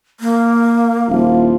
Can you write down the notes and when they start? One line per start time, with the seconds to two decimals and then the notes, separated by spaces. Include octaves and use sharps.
0.20 A#3
1.09 D#1 F3 E4 F4